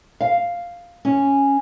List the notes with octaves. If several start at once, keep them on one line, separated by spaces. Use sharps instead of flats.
F5
C#4